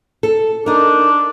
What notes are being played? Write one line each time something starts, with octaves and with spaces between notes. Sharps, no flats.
A4
D4 D#4 A#4